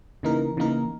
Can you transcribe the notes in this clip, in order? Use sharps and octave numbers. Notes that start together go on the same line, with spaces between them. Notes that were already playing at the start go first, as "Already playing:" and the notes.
C#3 E3 A#3 D#4 A#4
C#3 E3 A#3 D#4 A#4